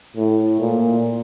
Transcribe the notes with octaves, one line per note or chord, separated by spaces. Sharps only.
A2
A#2